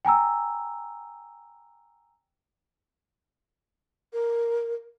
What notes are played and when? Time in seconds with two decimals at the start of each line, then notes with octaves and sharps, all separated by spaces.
0.05 G5 G#5 A#5 E6
4.13 A#4